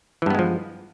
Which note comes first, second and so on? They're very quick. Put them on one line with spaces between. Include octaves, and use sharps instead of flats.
E3 G2 B3 G#3 F3